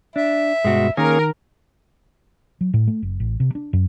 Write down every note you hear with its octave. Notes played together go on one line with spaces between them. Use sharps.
D4 E5
G2 B2 G#3 F#4
D#3 A#3 C#4 G#4 A#4
F#3
A2
A3
F#1
A1
C3
D4
F#2